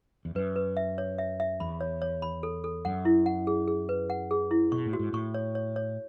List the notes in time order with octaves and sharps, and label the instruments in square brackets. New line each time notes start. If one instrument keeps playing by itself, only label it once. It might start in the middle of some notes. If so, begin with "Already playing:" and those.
[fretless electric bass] E2
[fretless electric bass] F#2 [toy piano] B4
[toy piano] B4
E5
C#5
E5
E5
[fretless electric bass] E2 [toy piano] B5
[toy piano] C#5
C#5
B5
A4
A4
[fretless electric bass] F#2 [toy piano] F#5
[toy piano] E4
F#5
G#4
G#4
B4
F#5
G#4
E4
[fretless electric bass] B2 [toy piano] C#6
[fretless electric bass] A2
[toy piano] F#4
[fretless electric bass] G#2
[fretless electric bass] A2 [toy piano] C#6
[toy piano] C#5
C#5
C#5